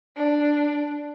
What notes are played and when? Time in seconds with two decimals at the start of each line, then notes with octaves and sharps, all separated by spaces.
0.17 D4